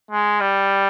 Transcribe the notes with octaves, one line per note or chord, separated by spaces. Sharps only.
G#3
G3